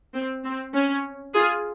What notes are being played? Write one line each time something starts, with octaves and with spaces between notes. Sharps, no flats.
C4
C4
C#4
F4 G#4